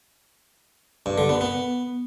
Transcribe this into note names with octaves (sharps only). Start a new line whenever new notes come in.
G2
D3
B3
B3